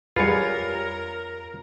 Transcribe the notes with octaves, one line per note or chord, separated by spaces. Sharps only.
F2 G3 F4 G#4 A#4 B4 C#5